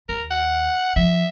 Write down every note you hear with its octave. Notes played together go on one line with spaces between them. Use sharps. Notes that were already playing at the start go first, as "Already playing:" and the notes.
D#2 A#4
F#5
F3 E5